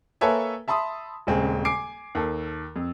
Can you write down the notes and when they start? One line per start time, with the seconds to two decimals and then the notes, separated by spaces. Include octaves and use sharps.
0.21 A#3 A4 B4 C#5 E5 G#5
0.68 E5 A5 B5 C6 D#6
1.27 D#1 C#3 G#3 C4
1.65 G#5 D6 C7 D7
2.15 D#2 A4
2.76 F2